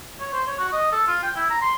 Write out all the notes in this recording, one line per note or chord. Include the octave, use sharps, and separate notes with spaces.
C#5
C5
C#5
F#4
D#5
A4
F4
G5
E4
A#5
C6